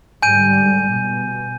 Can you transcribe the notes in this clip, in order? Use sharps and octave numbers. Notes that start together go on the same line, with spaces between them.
G#2 D3 G3 G#5 G6 D#7
B2